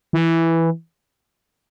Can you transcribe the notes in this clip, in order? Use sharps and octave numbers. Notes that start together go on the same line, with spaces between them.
E3